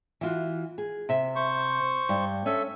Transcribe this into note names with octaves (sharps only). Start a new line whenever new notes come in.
E3 F4 F#4
G#4
C3 E5
C5 C#6
G2
C#4 A4 E5